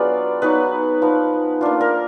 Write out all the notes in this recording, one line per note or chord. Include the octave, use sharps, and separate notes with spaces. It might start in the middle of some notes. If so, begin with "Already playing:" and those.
Already playing: F#3 B3 D4 F4 G#4 B4 D5
F#3 B3 D#4 B4
F3 B3 D#4
A#3 D4 F4
A#4